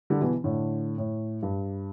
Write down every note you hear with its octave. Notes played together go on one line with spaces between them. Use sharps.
D3 G3
B2 E3
A2 D3
A2
G2